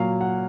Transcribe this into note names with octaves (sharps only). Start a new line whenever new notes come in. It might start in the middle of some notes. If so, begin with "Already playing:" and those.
Already playing: A#2 F#3 F5
F#5